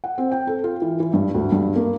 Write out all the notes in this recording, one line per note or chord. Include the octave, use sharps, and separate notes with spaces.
F#5
C4
G5
A4
F4
E3
E3
G2
D2
G2
A#3